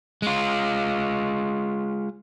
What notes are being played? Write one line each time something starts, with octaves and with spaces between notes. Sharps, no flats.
G#3 F4